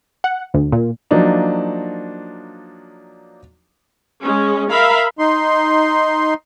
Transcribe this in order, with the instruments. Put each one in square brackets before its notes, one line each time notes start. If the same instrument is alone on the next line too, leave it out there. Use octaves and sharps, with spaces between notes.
[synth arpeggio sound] F#5
D2
A#2
[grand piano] F3 F#3 A#3 D4 D#4
[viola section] G#3 C#4
A#4 E5 F5 B5
[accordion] D#4 C6